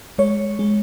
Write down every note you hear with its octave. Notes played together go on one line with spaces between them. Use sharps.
G#3 C#5
G#3